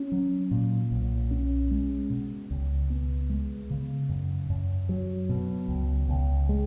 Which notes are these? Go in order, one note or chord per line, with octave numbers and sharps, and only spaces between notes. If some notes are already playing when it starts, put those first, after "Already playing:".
Already playing: C#4
F#3
A#2
B1
C#4
G#3
B2
C#2
B3
G#3
C#3
F#2
F#2
F#3
B2
C#2
C#2
G#3